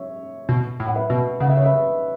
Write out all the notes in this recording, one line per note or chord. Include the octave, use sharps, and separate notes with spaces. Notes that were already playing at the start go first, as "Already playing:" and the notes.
Already playing: C#5 E5
B2
A2
F#5
B4 E5
B2
C#3 F#5
E5
C#5
B4 E5